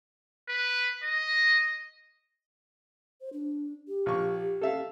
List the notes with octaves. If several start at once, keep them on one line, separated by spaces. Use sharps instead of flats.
B4
D#5
C5
D4
G4
A#1 C#6
A4 E5 F5